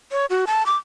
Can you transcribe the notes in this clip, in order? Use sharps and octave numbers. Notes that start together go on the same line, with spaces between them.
C#5
F#4
A5
D6